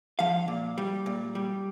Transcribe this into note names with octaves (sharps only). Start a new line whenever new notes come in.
F3 F5
A#2
G3
A#2
G3